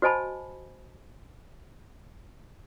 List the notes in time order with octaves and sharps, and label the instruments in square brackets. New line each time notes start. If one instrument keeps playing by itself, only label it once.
[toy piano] F#4 C5 D#5 G#5 A5 B5